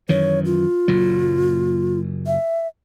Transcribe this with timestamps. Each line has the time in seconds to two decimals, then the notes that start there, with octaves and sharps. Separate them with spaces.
0.09 F#2 D#3 E3 C#5
0.45 F4
0.88 F#1 A#2 F#3
2.27 E5